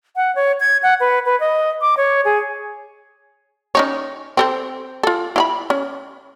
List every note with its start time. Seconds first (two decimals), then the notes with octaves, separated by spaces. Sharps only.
0.16 F#5
0.35 C#5
0.60 G#6
0.83 F#5
1.00 B4
1.26 B4
1.40 D#5
1.81 D6
1.97 C#5
2.25 G#4
3.75 C#4 D#4 C#5
4.37 C4 A4 C5
5.03 F4 A4
5.36 E4 F5 B5
5.70 C#4